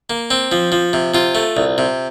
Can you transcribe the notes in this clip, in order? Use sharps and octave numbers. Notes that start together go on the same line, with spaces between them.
A#3
C4
F3
F3
C3
C3 F4
A3
C2
C3